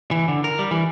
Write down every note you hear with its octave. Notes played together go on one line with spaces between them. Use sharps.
E3
D3
A#4
G3
E3